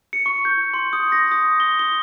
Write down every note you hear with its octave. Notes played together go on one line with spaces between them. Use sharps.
C#7
C#6
G6
C6
D#6
A#6
D#6
G7
G7